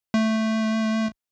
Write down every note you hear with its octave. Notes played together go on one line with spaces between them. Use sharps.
A3